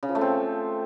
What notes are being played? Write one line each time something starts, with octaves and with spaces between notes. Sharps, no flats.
C#3
F3
A3
C4